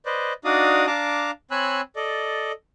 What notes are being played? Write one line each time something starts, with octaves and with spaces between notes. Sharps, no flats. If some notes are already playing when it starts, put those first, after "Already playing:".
B4 C5 D5 D#5
D4 D#4 F#4 D5 F5 D#6
D4 F5 A5 A#5 D6
C4 C#5 G#5 B5 E6 F#6
A4 D5 D#5